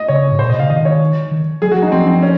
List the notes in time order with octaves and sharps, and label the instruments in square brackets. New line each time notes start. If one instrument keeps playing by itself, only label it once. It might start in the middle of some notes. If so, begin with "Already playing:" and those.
Already playing: [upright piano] D#5
[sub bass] C#3 [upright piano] C#5
[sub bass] G#2
[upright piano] C5
[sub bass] A#2
[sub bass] C3 [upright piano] D#5
[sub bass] C#3 [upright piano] F5
[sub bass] D#3 [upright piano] D#5
[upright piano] C#5
[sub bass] D#3
[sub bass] F#3 [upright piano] G#4
[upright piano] F#4
[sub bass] F#3
[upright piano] D#4
[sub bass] F3 [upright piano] C4
[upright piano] C4
C#4